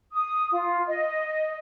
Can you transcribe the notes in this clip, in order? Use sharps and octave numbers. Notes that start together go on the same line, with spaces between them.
D#6
F4
D#5